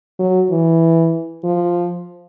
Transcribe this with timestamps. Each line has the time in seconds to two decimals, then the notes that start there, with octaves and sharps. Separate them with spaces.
0.19 F#3
0.51 E3
1.44 F3